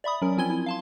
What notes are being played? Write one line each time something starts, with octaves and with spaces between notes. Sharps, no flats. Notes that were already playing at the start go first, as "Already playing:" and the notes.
D5 E5 B5 D#6
F#3 C#4 A#4
F3 C4 F4 G#5 G#6 G7
E4
F5 A5 C6